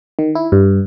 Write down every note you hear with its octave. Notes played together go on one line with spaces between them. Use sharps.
D#3
E4
G2